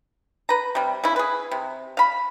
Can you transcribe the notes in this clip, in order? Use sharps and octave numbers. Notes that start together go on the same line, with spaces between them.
B4 A#5
C3 G3
C#3 E4
G#4 B4
C3
F5 B5